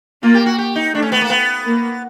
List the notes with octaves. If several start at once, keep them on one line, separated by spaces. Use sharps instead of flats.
A#3 F4
G4
F#4
G4
D#4
A3 D4
C#4
B3
A#3
B3
A#3